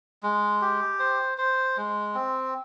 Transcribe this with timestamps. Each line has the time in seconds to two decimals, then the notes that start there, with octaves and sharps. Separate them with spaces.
0.23 G#3
0.61 G4
0.99 C5
1.38 C5
1.77 G#3
2.14 C4